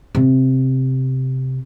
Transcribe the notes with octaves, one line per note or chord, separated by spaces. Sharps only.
C3 B3